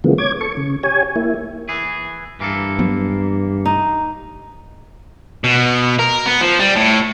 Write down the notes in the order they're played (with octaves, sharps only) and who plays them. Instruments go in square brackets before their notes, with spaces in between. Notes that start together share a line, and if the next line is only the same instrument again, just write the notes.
[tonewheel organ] C#3 E3 F3 G#3 A#3 B3
C#5 D6 G#6
A4 C#6
C#3
G4 C#5 G#5
A#3 E4
[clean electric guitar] E3 G#4
[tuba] G2 [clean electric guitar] E3 A#3 A4
[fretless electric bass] F3 F#3 B3
[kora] D#4
[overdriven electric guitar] B2
A#4
B3
F3
G3
A2